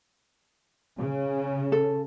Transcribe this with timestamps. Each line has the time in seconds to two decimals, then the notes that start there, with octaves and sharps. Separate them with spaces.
0.98 C#3
1.72 A4